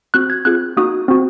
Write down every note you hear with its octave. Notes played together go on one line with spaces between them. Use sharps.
C4 F#4 F#6
G#6
C4 F4 G#4 F#6
A#3 D#4 F#4 D#6
C4 F#4